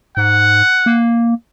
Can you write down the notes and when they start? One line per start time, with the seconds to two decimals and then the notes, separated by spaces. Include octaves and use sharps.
0.17 G#2 F#5
0.86 A#3